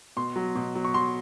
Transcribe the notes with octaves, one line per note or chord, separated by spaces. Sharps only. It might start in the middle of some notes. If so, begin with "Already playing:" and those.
B2 C6
F#3
B2
F#3
C#6
F#3 C6